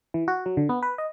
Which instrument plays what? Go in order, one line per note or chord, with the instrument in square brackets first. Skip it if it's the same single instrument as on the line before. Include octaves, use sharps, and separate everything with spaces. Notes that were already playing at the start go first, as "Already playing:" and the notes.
[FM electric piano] E3
F#4
F#3
D3
B3
B4
D#5